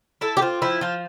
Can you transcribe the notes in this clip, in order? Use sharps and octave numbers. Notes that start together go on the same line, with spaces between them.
E4 A4
G4
C4 F4
F3 E4
F3 F4